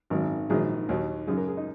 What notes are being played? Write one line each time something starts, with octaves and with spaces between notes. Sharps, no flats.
G#1 F#2 D#3 F#3
A#1 G#2 D#3 F#3 G#4
D#2 D#3 F#3
F#2 C#3 F#3 G#4
A#4
G#4
D#4